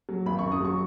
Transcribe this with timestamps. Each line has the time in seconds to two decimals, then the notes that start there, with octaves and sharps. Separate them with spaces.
0.09 F#3
0.26 G#1 B5
0.39 F#2 C#6
0.52 D#6
0.61 F#3 C#6